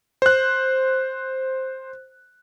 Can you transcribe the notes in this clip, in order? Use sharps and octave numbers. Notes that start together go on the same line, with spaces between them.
C5 F#6